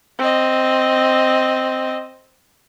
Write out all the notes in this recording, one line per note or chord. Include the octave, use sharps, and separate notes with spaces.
C4 D#5